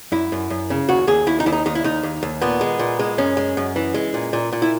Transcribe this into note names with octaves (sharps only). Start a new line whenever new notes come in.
F#2 E4
F#2
F#2
C#3
D#2 F#4
D#2 G#4
D#2 E4
D#4
D#2 E4
D#4
D#2 D#4
E4
D#2 D#4
D#2
D#2
A#2 B3
G#3
A#2
G#3
F#2 C#4
G#3
F#2
E3
G#3
A#2
A#2
A#2
E4